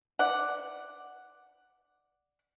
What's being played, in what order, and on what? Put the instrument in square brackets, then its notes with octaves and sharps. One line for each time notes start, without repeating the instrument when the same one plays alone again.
[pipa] D5 F#5